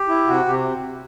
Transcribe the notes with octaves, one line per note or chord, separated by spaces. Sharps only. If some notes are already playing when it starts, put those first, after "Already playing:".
Already playing: G4
E4
C3 F#4
C3 G4